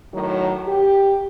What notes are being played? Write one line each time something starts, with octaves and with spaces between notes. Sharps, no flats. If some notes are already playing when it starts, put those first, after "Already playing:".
A2 D#3 F#3
G4